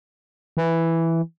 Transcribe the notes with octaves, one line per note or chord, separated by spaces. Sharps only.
E3